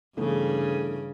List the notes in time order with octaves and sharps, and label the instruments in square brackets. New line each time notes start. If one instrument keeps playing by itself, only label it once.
[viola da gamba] G2 C#3 [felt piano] E3 A3 B3